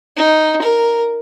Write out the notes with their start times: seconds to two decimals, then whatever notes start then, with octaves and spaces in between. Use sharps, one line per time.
0.17 D#4
0.62 A#4